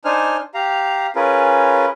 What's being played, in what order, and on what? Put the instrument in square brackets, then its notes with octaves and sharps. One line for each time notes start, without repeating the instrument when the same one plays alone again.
[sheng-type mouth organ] D4 D#4 C5 G#5 F6
G4 F5 A#5
C#4 F4 G#4 A#4 B4